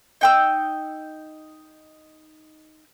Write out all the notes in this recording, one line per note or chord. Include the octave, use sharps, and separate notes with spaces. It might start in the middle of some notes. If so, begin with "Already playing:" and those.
D#4 G5 E6